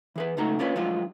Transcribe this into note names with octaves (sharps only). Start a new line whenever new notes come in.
E3 G#4 B4
C#2 F#2 A3 D#4 F#4 A#5
A#3 C#4 D4 F4 B4 C#5
F3 F#3 G#3 D4 F4